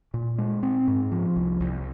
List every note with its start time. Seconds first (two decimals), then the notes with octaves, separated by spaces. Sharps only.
0.14 A#2
0.38 G#3
0.63 C4
0.88 G#2
1.12 F3
1.36 C2
1.60 C2